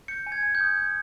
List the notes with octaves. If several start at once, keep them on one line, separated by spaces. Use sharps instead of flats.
G6 C#7
G#5
G#6
G#5
G6
D#6
G6